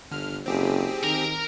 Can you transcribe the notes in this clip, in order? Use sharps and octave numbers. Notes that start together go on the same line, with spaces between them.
G1 D3 F6
F#1 C4 G4 G#4
D#3 A#4 A#5